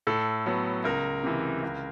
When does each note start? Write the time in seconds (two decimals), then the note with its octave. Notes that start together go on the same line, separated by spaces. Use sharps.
0.07 A2 A4
0.46 F#3 B3
0.84 C#2 A#4
1.24 C3 E3
1.62 C#2